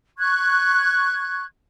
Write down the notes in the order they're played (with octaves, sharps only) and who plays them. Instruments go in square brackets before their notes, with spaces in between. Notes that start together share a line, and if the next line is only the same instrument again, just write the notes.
[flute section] C#6 F#6 G#6